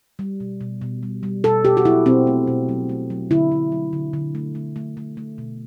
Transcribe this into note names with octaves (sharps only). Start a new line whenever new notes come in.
G3
B2
B2
B2
G3
G3
B2 A4
B2 G4
F#4
F#3 E4
B2 C4
A3
B2
F#3
A3
F#3
D3 E4
D3
F#3
D3
D3
A3
A3
A3
A3
A3
B2